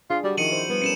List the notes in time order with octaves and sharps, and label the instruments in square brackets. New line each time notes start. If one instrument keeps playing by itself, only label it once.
[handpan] D4 G#4 [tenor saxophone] F4
[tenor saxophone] G3 [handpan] F#4 G4
[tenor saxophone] D#3 [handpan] F3 E4 [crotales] C#7 D#7 F#7
[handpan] C5
[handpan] G3 [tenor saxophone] B3
[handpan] C#4 F#4 A#4 [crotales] C#7 D#7 E7